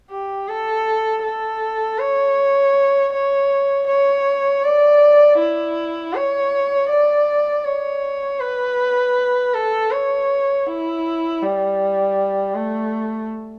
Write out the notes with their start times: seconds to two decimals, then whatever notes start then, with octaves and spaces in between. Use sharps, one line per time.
0.10 G4
0.49 A4
1.23 A4
1.99 C#5
3.13 C#5
3.88 C#5
4.64 D5
5.39 E4
6.14 C#5
6.90 D5
7.65 C#5
8.40 B4
9.54 A4
9.91 C#5
10.67 E4
11.42 G3
12.55 A3